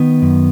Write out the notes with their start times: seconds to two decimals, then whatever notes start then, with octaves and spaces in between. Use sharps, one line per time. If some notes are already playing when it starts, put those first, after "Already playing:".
Already playing: D#3 B3
0.22 F#2